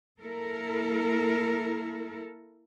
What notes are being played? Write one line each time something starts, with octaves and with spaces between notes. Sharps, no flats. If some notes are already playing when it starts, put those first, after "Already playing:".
A#3 E4 A4 A#4